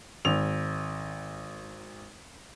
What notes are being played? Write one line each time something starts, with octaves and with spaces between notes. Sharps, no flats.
G#1 F7